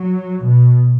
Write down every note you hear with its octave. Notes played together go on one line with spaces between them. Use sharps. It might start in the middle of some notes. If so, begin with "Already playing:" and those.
Already playing: F#3
B2